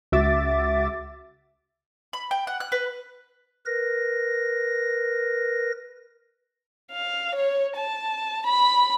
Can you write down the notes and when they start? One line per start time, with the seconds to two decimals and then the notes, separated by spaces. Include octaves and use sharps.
0.12 C#2 F#4 E5 D6 A6
2.13 B5
2.31 G5
2.47 F#5
2.60 F#6
2.72 B4
3.66 A#4 B4 A#6
6.92 F5
7.35 C#5
7.76 A5
8.47 B5